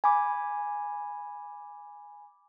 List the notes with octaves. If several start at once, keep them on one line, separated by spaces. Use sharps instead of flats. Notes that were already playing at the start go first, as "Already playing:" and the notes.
G#5 B5 D6